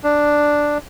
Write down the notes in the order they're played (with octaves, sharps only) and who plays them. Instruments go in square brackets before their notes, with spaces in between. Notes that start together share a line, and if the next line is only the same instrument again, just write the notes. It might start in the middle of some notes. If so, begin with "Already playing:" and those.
[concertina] D4